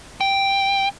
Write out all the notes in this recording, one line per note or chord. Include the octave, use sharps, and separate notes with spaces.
G5